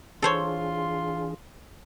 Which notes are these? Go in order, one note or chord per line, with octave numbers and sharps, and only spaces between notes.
E3 D4 F4 G#4 A4 C5 C#5 C6